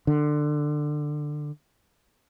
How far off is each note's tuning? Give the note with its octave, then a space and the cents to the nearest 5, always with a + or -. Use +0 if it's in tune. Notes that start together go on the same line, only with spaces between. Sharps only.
D3 +20